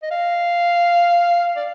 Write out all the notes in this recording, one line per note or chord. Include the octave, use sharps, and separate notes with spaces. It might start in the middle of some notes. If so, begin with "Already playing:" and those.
D#5
F5
D5